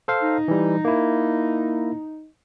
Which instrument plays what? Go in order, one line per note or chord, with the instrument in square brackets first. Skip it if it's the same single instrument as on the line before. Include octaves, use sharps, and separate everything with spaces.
[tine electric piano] A4 C5 F5
[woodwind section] D#4
[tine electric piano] E3 G3
A#3 E4